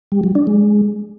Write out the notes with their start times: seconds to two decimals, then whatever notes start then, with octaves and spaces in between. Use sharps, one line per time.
0.12 G3
0.24 F#3
0.35 D4
0.47 G#3